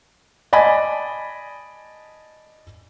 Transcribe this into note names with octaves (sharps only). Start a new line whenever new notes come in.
D5 D#5 G#5 A5 B5